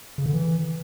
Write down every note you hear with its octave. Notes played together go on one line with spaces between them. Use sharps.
C#3
D3
E3